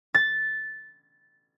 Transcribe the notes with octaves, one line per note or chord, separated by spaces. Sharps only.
A6